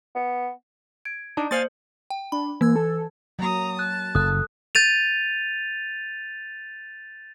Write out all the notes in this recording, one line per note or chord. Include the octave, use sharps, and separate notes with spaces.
B3
G#6 D7
D4 D#4 D5 A5
A#3 C5 F5 G#5 G6 A6
G5
D4 B5
E3 A#3 E6 G#6
A4
F#3 A#3 A#5 D#6
A5 F#6
F#1 A4 D#6 F#6
G6 A6 D#7 F7